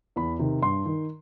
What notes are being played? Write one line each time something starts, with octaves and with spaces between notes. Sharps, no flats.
E2 B5
C3 D#3
G2 C6
D#3